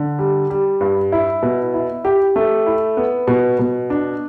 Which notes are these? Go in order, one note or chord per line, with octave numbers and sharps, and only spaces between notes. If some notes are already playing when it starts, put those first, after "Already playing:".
Already playing: D3
G3
G3
G2
E4
B2
E4
G4
A3
E4
B3
B2
B2
D4